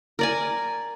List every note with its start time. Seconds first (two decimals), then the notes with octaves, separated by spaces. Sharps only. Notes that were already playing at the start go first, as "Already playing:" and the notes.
0.19 A#4 D5 G#5